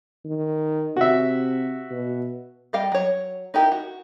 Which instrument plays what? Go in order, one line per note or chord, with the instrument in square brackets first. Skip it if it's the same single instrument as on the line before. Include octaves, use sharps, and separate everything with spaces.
[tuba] D#3
[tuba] C3 [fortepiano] F#4 E5
[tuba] B2
[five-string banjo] G3 D#5 F5 G5
F#3 C#5
D#4 E4 G4 G#4 A#4
F#4